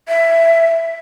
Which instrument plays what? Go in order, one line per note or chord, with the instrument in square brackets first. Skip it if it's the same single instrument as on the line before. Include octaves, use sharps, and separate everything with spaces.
[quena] E5